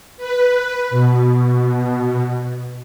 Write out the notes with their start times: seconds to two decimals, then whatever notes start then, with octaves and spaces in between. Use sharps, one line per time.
0.17 B4
0.90 B2